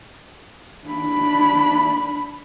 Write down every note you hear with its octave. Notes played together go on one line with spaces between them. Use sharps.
D4 B5